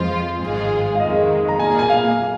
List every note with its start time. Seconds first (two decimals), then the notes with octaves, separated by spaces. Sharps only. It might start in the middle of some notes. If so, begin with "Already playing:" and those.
Already playing: F2 F3 G#3 F4 C5 D#5
0.41 G#1 G#2 G#3 F4 G#4
0.95 F5
1.00 F2 D#3 G#3 D#5
1.48 A#5
1.59 A#2 A#3 G#4 G#5
1.79 G#5
1.89 F5